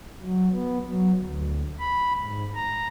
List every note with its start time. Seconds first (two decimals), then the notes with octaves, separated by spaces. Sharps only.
0.21 F#3
0.52 B3
0.88 F#3
1.20 D2
1.79 B5
2.19 G#2
2.55 A#5